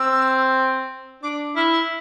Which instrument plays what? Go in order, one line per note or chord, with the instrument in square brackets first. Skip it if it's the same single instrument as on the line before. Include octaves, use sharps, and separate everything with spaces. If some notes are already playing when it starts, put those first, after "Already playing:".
Already playing: [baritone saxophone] C4 [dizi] E6
[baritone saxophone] D4 [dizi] D6
[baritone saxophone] E4 [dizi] F6
[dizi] E6